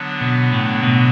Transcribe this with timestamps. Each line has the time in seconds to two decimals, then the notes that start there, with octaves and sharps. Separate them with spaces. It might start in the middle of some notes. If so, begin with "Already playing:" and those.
Already playing: D3 F#3 B3 D4
0.21 B2
0.53 A2
0.83 B2